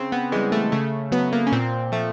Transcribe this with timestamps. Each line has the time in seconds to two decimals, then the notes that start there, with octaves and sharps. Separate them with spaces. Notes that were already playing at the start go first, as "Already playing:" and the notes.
Already playing: C#3 C4
0.12 B3
0.32 E3 G3 G#3
0.52 A3
0.72 C#3 A3
1.11 F#3 B3
1.33 A#3
1.47 C#4
1.52 A#2 C4
1.92 F3 A3